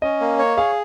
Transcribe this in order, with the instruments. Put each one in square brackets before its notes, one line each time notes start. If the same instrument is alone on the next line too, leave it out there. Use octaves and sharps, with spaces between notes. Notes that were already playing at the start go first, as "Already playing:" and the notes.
[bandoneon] C#4 [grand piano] D#5
[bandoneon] A#3
C#5
[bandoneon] G#4 [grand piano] F5